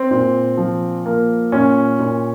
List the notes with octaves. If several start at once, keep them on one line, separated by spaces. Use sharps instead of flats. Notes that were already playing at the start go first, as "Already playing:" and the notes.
Already playing: C4
A#2
F3
A#3
A#2 C#4
A#2